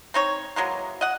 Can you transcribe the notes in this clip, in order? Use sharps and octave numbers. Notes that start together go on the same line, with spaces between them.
C4 D#4 C#5
E3 F#3 G#3 A#3
D#5 F#5